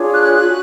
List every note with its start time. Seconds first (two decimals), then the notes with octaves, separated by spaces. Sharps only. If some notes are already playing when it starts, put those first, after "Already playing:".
Already playing: D4 F4 G#4 C#5
0.12 F#6
0.23 F#6
0.34 F#6
0.46 F#4